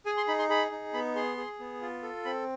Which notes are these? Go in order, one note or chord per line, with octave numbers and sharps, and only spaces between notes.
G#4 G#5
C6
D#4 B5
C6
G#4 B5
D#4
B3 B5
G#4 C6
G#4
B3
F4
A4
C4 B5